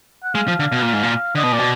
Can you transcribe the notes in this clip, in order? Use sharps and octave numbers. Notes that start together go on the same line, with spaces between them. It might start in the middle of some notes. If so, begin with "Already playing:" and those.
F#5
G#3 F5
F3
D3
B2
A#2
G#2
A#2
D3 D#5
B2
A#2 D5
B2